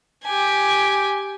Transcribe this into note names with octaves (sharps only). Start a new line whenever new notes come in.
G4 G#5